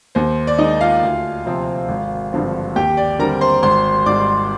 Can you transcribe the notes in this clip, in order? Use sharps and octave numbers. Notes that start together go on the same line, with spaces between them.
D#2 C5
D5
D#3 G#3 D#4 D#5
F4 F5
D2
C3 F3 C4
G#1
G2 D3 F3 C4
D#2 G4 G5
D5
D3 G3 C4 A#4 A#5
C5 C6
G#1 C5 C6
G#2 G3 D5 D6